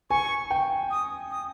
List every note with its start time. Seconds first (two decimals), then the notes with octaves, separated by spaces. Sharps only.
0.10 G#5 C#6
0.51 G5
0.91 D#6
1.31 D#6